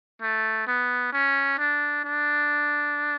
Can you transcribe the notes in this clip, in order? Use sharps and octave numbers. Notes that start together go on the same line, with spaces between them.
A3
B3
C#4
D4
D4